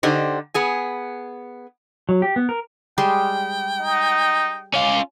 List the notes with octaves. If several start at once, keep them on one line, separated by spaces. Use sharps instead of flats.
D3 D#4 G4 C5
B3 G#4 G#5
F#3
G4
B3
A#4
G3 G#3 G5 C6
D#4
C#4 F4 D6